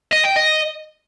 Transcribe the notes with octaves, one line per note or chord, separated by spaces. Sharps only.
D#5
G5
D#5